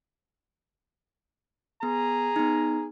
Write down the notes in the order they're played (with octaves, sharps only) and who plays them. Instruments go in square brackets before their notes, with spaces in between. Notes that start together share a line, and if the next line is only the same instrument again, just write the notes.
[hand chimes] B3 [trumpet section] G#4 A#5
[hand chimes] B3 D#4